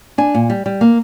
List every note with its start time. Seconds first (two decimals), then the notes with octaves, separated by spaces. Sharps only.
0.18 D4 G#5
0.34 A#2
0.50 G3
0.66 G3
0.81 A#3